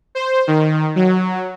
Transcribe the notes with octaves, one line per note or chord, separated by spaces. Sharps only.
C5
D#3
F#3